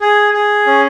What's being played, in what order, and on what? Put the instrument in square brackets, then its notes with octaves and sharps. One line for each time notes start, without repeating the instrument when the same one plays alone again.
[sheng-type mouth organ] G#4
G#4
C#4